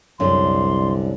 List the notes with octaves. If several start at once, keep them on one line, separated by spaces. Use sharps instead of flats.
C2 F#2 D3 C6